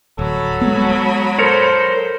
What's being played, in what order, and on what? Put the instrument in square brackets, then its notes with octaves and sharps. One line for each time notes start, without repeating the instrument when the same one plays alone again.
[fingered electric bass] D1 [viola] F#3 B5 [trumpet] A4
[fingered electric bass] G#3 B3
[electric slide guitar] A4 A#4 C#5 [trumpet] C5